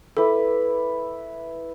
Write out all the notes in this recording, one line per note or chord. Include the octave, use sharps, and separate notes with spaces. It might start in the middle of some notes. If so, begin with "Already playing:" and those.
E4 A4 B4 D6